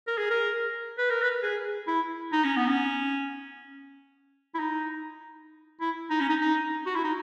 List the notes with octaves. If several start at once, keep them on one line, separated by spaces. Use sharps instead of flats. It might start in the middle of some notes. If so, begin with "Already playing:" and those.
A#4
G#4
A#4
B4
A#4
B4
G#4
E4
D#4
C#4
B3
C#4
E4
D#4
E4
D#4
C#4
D#4
D#4
F#4
E4
D#4